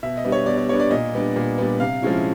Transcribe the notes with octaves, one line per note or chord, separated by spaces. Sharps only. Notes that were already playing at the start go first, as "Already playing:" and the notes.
B2 E5
D#5
G3 B3 D4
C#5
B2 D5
D5
G3 B3 D4 C#5
D5
A#2 D#5
G3 B3 D4
A#2
G3 B3 D4
C3 F5
F3 G#3 C#4 E4